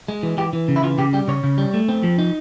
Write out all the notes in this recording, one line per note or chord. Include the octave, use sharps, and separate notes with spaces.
G#3
E3
E3 G4
E3
C#3
E4
E3 F4
C#3 G4
G3 G4
C#3 C#5
C#3
G3
A3
C4
F3
D#4